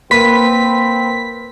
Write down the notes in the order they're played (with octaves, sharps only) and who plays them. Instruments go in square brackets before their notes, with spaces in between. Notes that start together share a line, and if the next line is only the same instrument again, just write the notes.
[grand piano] A#3 [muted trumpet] C4 [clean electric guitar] B4 [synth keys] B6